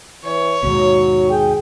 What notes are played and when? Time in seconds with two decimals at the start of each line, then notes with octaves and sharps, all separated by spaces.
0.24 E3 C#5
0.63 D#2 G#2 B2 F#3
1.29 G#4 G5